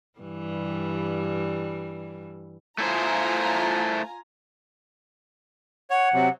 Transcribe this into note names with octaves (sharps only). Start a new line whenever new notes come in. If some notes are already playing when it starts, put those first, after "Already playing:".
G2 E3 G3
A3 E4 F4 C5 G#5 A#5
C#5 F#5
C3 F#3